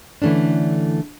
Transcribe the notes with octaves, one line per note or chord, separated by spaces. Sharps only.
D3 E3 A3 C#4 D4